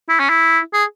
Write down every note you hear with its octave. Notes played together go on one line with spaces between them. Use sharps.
E4
C#4
E4
G#4